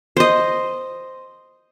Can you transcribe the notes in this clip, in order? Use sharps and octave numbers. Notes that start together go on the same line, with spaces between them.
C5 D#5